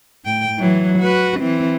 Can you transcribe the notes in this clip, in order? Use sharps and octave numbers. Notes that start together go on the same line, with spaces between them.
A2 G5
E3 F#3
F#4 B4
E3 C4